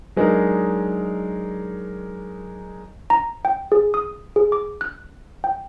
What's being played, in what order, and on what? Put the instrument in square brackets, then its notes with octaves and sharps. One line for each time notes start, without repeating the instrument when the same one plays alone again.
[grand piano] F#3 G#3 D4 D#4 A#4
[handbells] A#5
G5
G#4
D#6
G#4
D6
F#6
G5